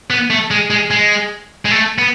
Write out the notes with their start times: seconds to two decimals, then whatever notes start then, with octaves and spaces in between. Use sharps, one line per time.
0.10 B3
0.30 A3
0.51 G#3
0.70 G#3
0.91 G#3
1.65 G#3
1.71 A3
1.98 B3